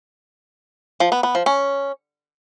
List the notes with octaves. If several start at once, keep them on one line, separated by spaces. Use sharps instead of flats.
F3
B3
B3
F3
C#4